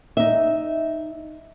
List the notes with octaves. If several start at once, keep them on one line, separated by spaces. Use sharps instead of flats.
D#4 E5